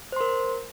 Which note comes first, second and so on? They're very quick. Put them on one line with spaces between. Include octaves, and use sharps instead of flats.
C5 C6 A#4